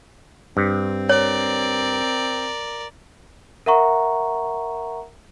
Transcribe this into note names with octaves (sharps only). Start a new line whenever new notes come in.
G2 C4
A#4 C#5 D5
A#4 E5 F#5 A#5 C#6